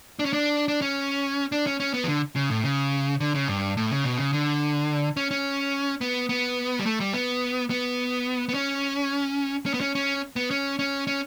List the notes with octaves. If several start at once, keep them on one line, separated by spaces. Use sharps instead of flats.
D4
C#4
D4
D4
C#4
D4
C#4
C#4
B3
E3
D3
C#3
A2
C#3
D3
C#3
G2
A2
C#3
B2
C#3
D3
C#4
C#4
B3
B3
G3
A3
G3
B3
B3
B3
C#4
C#4
B3
C#4
C#4
B3
C#4
C#4
C#4